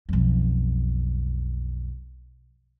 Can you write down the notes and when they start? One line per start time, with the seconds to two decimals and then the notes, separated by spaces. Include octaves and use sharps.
0.09 B1 F2